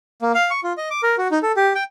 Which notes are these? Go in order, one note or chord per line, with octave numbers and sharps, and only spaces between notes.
A#3
F5
C#6
F4
D#5
D6
A#4
F#4
D#4
A4
G4
G5